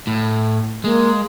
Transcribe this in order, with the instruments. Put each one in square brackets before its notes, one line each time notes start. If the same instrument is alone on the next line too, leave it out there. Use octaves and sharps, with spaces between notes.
[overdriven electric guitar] A2
[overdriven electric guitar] G#3 [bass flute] A#3